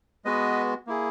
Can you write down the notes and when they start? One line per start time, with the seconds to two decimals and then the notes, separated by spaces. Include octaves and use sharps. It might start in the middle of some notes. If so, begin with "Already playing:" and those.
0.25 G#3 B3 F#4 B4 D#5
0.87 A#3 E4 G#4